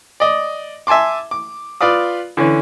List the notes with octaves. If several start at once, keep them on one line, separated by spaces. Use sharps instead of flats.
D5 D#5
E5 G#5 A5 C6 D6
D6
F4 B4 D5 F5 D#6
D3 E3 C#4